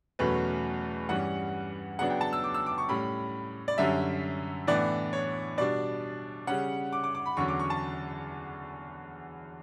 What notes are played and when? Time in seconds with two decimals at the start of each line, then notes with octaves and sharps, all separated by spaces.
0.19 E2 B2 F#3 A3 C#4 B4
1.09 G2 E3 G3 C#4 F#5
1.99 C#3 F#3 B3 D4 F#5
2.10 G5
2.21 A5
2.33 E6
2.44 D6
2.54 E6
2.66 D6
2.78 C#6
2.89 A2 G3 C#4 B5
3.68 D5
3.78 F#2 D3 G3 C#4 E5
4.67 A2 E3 B3 D4 D5
5.13 C#5
5.57 B2 G3 D4 D5
6.47 C#3 G3 C#4 F#5
6.93 D6
7.04 D6
7.15 D6
7.26 B5
7.37 E2 D3 F#3 C#4 C#6
7.48 D6
7.59 C#6
7.70 A5